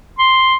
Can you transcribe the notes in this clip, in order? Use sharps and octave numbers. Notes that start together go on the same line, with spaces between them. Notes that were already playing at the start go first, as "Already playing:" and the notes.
C6